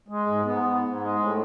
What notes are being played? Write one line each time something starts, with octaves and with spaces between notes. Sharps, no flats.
G#3
G#2
G#2 B3
G#2
G#2
G#3
A2